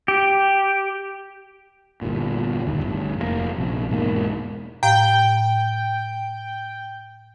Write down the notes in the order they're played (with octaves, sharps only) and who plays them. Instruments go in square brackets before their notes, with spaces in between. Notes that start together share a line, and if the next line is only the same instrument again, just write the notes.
[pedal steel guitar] G4
[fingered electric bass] G1 A#2
D1 G1 D#2
G1 D2
F1 C#3 A#3
A#1 C3
E1 G#2 A#3
[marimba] A2 F5 [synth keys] G5